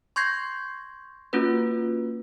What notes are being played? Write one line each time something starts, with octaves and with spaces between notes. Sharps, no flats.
C6 C#6 G6 G#6 A#6 C7
A#3 C#4 F4 F#4 B4